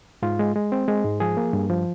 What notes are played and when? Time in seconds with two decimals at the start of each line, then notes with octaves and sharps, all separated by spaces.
0.22 G#2 F4
0.39 G#3
0.56 G#3
0.72 C4
0.88 G#3
1.04 G#2
1.20 F3 G#4
1.37 A#3
1.53 G2
1.70 F3